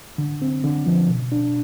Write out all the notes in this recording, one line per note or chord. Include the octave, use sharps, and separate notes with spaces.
D3
C4
D3
F3
B2
D4